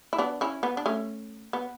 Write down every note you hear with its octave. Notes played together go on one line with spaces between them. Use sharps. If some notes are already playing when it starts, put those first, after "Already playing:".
E4
B3 D4
C#4 E4
B3
D4
A3 C#4
B3